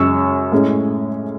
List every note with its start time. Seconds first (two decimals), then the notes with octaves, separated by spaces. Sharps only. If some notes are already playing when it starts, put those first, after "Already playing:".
Already playing: F#2 C#3 G#3 C#4 C#6 E6
0.52 A2 G#3 C#4